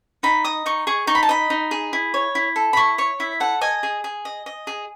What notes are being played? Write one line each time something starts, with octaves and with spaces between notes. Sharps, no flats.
D#4 B5
D#5 D#6
D#4 C#6
G#4 C#6
D#4 C#6
B5
A5
D#5 B5
D#4
G#4
E4
C#5
E4
A4
B5
E4 C#6
C#5 C#6
E4 E5
A4 F#5
D#5 G#5
G#4
G#4
D#5
D#5
G#4